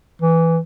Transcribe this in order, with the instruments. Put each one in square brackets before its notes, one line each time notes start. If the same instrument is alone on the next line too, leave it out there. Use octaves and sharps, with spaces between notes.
[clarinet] E3